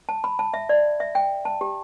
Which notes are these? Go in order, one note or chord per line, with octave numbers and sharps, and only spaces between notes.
A5
B5
A5
E5
D5
E5
G5
A5
G4